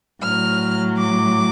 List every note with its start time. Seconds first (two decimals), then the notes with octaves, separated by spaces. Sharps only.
0.22 A2 F#3 F6
0.98 D6